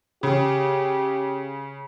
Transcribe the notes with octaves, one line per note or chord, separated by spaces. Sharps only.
C#3 G4